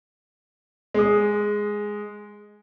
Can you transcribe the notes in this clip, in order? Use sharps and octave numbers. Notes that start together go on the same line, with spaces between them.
G#3 D#6